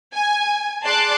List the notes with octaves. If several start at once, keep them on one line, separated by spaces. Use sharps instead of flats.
G#5
G#4 D5 A5 C6 D6 F#6